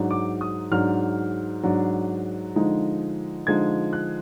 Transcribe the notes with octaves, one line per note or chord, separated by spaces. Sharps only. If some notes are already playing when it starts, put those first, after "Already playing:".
Already playing: G#2 F#3 D4
D6
D#6
G#2 F#3 D4 F6
G#2 F#3 D4
D3 F3 G#3 D#4
D3 F3 G#3 D#4 G#6
F#6